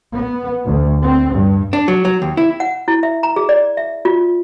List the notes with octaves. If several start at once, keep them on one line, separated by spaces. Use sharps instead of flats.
B3
D2
C4
G2
D4
F#3
F#3
D#2
E4
F#5
E4
E5
A#5
G#4
D5
E5
F4